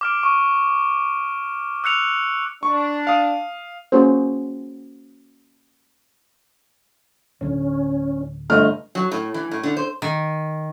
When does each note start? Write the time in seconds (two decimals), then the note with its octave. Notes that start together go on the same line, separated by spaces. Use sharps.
0.01 D6 F6 D7
0.23 C#6
1.84 E6 F#6 C#7 F7
2.63 D4 C#6
3.07 F5 D#6
3.92 A#3 C#4 F#4 G#4 C5
7.41 D1 D3 C#4
8.50 G1 A3 D#5 F6
8.95 F#3
9.11 A2
9.34 E3
9.51 A2
9.63 D3
9.77 C5
10.02 D#3